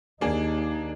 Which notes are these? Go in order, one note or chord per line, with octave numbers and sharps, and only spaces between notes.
D#2 A#3 D4 D#4 G#4